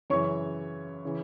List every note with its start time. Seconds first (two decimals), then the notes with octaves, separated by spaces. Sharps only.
0.10 F#2 C#3 E3 C#5 C#6
1.05 C#3 E3